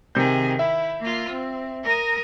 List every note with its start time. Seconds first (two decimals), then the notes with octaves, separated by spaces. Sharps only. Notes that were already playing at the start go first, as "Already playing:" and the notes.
0.15 C3 D#3 G#4 G6
0.59 E4 E5
1.00 A#3 F4
1.30 C4
1.84 A#4 A#5 D#6